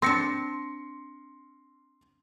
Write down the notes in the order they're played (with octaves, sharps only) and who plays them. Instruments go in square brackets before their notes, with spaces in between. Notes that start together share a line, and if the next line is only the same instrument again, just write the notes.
[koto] C4 D4 [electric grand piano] C6 A#6 C#7